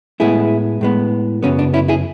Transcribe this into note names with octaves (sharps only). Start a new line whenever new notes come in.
A2 G#3 B3 E4 G#4
A2 G#3 B3
F#2 C#3 F#3 B3 C#4
D4
C#4 E4
E4 G#4